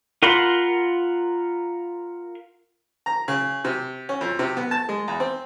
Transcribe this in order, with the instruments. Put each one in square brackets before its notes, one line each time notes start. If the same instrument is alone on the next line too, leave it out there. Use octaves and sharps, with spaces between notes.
[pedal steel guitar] F4 A#4 F#5 B5 C6
[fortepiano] A#5
C#3
C3
C#4
F2
C3
B3
A5
G#3
E2
C4